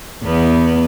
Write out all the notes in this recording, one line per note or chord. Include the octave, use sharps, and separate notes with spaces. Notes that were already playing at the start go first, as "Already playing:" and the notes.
E2 B3